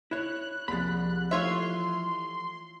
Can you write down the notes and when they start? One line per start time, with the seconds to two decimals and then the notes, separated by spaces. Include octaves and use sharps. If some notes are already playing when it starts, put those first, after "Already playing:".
0.11 E4 C#5 B5 F#6
0.68 C2 F3 A#3 G#4 B5 A6
1.31 E3 G3 A3 F4 C#5 E5 C6